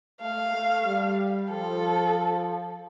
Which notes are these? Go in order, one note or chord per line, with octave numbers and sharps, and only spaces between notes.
A3 F5
A3
G3
F3 A4